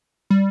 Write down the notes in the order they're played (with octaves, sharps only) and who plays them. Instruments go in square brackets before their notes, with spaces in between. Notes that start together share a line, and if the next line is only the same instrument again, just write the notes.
[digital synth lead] G3